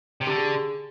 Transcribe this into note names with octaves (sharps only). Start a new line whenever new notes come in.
C3
D3 G4
G#4